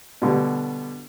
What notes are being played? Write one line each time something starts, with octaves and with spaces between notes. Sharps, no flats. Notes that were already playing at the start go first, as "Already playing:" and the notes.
B2 D3 G3